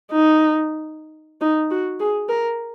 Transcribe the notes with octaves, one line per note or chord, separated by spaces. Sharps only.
D#4
D#4
F#4
G#4
A#4